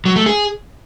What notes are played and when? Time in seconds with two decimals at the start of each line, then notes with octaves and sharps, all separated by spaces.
0.05 F#3
0.16 A3
0.26 G#4